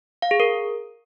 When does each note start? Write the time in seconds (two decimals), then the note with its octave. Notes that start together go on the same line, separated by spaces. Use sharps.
0.22 F5
0.31 G#4
0.40 A#4